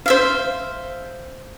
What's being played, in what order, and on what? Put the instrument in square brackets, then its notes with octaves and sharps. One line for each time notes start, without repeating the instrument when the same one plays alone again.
[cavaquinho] C5 E5 F5